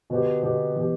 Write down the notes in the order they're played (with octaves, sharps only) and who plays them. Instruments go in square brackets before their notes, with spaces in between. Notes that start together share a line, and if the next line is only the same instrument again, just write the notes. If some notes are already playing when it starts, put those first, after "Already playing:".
[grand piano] B2 B3 G4 [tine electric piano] D3
[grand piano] B2 B3 G4 [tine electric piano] D3
[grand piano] B2 B3 G4 [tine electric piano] E3